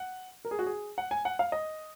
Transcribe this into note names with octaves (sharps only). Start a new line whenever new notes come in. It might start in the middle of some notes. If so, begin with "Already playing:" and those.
Already playing: F#5
A#4
G#4
F#4
G#4
F#5
G#5
F#5
F5
D#5